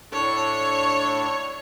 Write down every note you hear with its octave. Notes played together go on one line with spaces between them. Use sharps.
A2 D4 A4 C#5